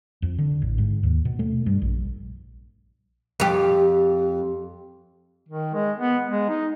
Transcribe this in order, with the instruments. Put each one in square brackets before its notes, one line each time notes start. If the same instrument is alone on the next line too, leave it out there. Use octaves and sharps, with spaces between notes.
[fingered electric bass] F2
D3
A1
G#2
D#2
B2
A3
G2
A#1
[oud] F2 G4
[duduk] D#3
G#3
B3
G#3
D#4